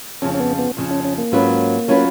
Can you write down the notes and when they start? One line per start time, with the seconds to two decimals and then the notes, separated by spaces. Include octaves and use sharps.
0.22 F2 C#3 F3 C#4
0.34 C#4
0.40 B3
0.59 B3
0.77 F2 C#3 F3
0.91 C#4
1.04 C#4
1.18 A#3
1.32 G#2 F#3 C#4 F4 B4
1.88 F#3 C#4 F4 B4